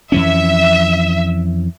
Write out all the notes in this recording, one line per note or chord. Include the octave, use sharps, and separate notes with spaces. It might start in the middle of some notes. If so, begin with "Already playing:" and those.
F2 E3 C#4 E5